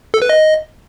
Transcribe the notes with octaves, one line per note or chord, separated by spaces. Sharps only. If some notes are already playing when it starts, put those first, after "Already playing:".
A4
B4
D#5